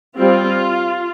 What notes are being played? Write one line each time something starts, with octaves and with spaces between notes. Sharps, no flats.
G3 C4 F4